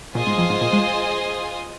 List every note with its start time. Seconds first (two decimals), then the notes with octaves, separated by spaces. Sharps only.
0.15 A#2 F4 G#4 C5 D#5 G#5
0.27 G#2
0.38 F2
0.50 G#2
0.61 A#2
0.73 G#3